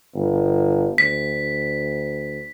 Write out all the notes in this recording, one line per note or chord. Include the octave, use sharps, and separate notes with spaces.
G1
D2 B6